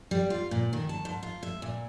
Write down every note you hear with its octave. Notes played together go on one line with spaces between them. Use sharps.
G3
F4
A#2
D#3
A5
G#2
F4
E5
A#2